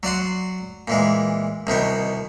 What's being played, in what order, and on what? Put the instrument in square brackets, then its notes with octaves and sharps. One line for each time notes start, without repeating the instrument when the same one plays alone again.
[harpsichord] F#3 D5 F#5 C6
A#2 E3 G#3
C2 B2 D#3 B3